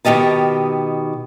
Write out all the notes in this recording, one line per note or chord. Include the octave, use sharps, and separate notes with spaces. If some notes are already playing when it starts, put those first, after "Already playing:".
B2 D#3 G4 D#5 A5